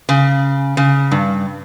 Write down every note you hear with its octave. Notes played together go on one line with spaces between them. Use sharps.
C#3
C#3
G2